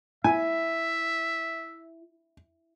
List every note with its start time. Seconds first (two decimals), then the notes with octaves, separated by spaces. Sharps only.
0.24 E4 E5 G#5